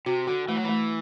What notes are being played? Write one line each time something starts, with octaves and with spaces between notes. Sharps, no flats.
C3 F#4
D3 F#4
E3 A3
F#3
E3 A3